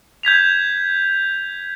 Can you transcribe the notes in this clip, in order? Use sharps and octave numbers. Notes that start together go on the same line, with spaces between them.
G6 G#6 B6 F7